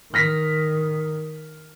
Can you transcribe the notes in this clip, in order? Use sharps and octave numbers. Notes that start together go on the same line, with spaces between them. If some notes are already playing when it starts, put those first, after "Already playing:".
D#3 F6 A#6 B6